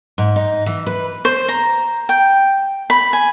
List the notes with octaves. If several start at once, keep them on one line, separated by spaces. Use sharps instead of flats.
G#2
D#4
E3
B4
C5
A#5
G5
B5
G#5